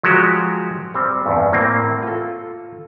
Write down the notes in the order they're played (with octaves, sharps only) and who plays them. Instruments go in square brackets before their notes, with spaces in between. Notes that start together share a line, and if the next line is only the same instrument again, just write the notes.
[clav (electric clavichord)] F3 F#3 G#3 F#4 G4
G3 C4
E2 G2
A2 A#3 C4
F4 A4